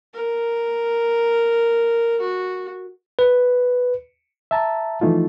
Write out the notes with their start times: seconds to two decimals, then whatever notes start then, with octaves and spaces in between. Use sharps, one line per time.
0.13 A#4
2.21 F#4
3.19 B4
4.51 E5 A5 A#5
5.01 E3 F3 A3 D#4 F4